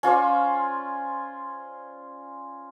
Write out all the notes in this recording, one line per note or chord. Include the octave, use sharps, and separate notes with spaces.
C#4 F4 C5 D5